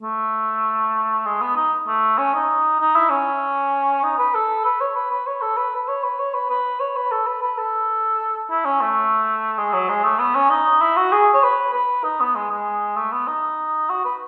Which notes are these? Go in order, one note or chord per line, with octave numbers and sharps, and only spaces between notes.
A3
G#3
B3
D#4
A3
C#4
D#4
D#4
E4
C#4
D#4
B4
A4
B4
C#5
B4
B4
C#5
A4
B4
B4
C#5
B4
C#5
B4
B4
C#5
B4
A4
B4
B4
A4
E4
C#4
A3
G#3
F#3
G#3
A3
B3
C#4
D#4
E4
F#4
G#4
C#5
B4
B4
D#4
B3
G#3
G#3
A3
B3
D#4
F#4
B4